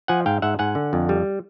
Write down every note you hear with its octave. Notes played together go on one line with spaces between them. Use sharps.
F3 F#5 G#5
G#2 F5 G5
G#2 E5 F#5
G#2 F#5 G#5
D3
F2
G3